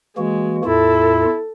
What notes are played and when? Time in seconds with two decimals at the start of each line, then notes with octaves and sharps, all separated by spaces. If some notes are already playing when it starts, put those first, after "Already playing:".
0.17 E3 G#3 A#3 F#4
0.65 E2 A2 E4 F4 A4